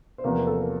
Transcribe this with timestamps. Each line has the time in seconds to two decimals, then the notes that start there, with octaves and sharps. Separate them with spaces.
0.18 C5
0.24 E2 C3 F3 A#3 B4
0.35 A#4
0.47 A4
0.58 A#4